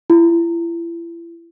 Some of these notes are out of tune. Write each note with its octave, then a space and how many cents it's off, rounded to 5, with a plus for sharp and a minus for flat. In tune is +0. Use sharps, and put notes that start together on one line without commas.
E4 +35